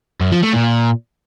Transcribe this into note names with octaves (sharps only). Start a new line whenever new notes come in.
F#2
F3
A3
A#2